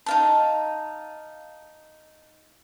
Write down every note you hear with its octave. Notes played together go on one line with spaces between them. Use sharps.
D#4 F5 A5